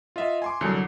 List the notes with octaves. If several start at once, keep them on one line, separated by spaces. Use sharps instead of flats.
F4 D#5 E5
G#5 C6 D6
C2 D3 F#3 C#7